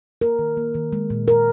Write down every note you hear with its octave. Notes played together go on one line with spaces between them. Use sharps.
A#3 A#4
D#3
A#3
D#3
G#3
A#2
G#3 A#4